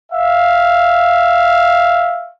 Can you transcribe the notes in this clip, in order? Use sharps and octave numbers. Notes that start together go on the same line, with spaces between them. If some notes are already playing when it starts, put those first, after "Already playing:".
E5 F5